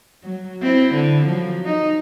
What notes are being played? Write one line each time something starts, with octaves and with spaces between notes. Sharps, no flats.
F#3
C4 E4
D3
F3 F#3
D#4